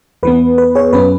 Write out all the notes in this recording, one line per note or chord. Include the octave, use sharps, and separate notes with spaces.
E2 E3 B3 B4
B4
G#4 C#5
F#2 F#3 C#4 B4